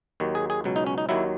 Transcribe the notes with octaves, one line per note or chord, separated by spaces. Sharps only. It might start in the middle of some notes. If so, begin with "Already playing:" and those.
D#2 D#3 F#3
G#4
G#4
C#2 B2 F#3
D#4
C#4
D#4
D#2 D#3 F#3 E4